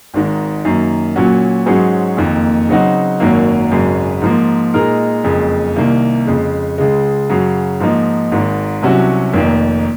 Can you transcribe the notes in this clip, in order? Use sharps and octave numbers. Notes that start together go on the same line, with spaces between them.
G#1 G#2 D#3
F#2 D#3 A#3
A#2 F#3 C#4 F#4
G#2 F#3 C#4 G#4 C5
F#1 F2 D#3 A#3
C#3 F#3 C4 D#4 F#4
G#1 F#2 D#3 F#3 A#3
G#1 F#2 C#3 G#3
G#2 F3 A#3
A#2 G#3 D#4 A#4
F#1 F2 C#3 G#3
C2 C3 D#3 A#3
F2 C#3 G#3
C#2 C#3 G#3
F#2 C#3 F#3
G#2 F3 A#3 D#4
G#1 G#2 D#3
C2 C3 F#3 C#4 F#4
F1 F2 D#3 A#3